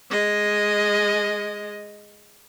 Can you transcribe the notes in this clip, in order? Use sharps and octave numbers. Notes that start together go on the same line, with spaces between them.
G#3 D#5